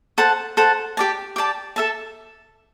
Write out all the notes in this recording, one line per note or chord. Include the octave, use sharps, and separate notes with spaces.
A4 C5 F#5 A5
A4 C5 F#5 A5
G4 D5 A5
G4 D5 A5
A4 E5 A5